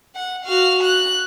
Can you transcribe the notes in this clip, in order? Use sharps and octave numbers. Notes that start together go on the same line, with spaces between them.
F#5
F#4 F5
F#6